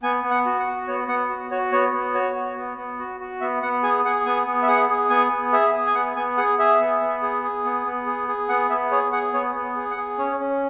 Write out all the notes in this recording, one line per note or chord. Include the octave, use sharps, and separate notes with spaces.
B3 G#5
B3
F#5
F#4
F#5
F#4
B3 C#5
B3 F#5
F#4
F#4 C#5
B3 C#5
B3
F#4 C#5
F#4
B3
B3
F#4
F#4
B3 E5
B3 F#5
G#4 G#5
G#4 F#5
B3 G#5
B3
E5
G#4 F#5
G#4
B3 G#5
B3
G#4 E5
G#4
G#5
B3 F#5
B3 G#5
G#4 F#5
G#4 E5
B3
B3
G#4
G#4
B3
B3
G#4
G#4
B3 F#5
B3 E5
G#4 C#5
G#4 F#5
B3 C#5
B3
G#4
F#5
G#4
C#4 C#5
C#4